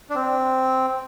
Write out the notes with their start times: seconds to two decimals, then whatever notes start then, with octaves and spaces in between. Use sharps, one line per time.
0.10 D4
0.15 C4